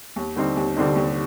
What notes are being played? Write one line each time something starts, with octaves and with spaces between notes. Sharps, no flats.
D#2
D3 G3 C4 D#4
D#2
D3 G3 C4 D#4
D#2